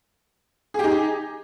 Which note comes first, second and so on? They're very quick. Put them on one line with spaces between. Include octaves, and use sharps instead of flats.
G#4 G4 D#4